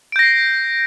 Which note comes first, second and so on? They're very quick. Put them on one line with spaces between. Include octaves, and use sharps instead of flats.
D7 G6 A#6 C7